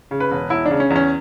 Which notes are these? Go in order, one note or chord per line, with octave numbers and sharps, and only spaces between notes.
C#3
B4
E1
E1 E4
C#3 D4
C#4
E2
C#4